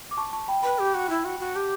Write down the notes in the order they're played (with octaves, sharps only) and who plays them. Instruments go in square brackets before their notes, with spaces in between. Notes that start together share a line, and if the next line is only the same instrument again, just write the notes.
[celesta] D6
A5 C#6
A5 C#6
G5 B5
[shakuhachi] B4 [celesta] G5 B5
[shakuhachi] G4
F#4
E4
F#4
F#4
[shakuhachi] G4 [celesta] F#5 A5